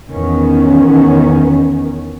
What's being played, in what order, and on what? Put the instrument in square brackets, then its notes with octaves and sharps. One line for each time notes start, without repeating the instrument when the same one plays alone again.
[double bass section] E2 D#3 B3 C#4